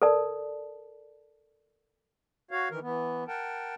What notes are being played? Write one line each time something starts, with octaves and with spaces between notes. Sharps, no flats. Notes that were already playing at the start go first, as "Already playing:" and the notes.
A4 A#4 D5 A5
F#4 C#5 F5
D#3 E3 A#4
E3 B3
A#4 F#5 G5 A5